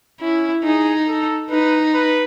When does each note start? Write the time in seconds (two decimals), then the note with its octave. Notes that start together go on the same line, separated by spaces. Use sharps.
0.20 C#4 E4
0.63 D#4 G#4
1.08 A4
1.50 D#4 B4
1.94 B4